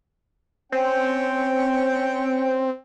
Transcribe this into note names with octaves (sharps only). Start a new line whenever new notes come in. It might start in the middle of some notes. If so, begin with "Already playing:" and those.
C4 C#4 G5